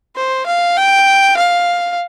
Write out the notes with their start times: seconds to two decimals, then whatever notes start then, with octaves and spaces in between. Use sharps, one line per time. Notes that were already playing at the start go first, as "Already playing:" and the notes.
0.16 C5
0.47 F5
0.77 G5
1.38 F5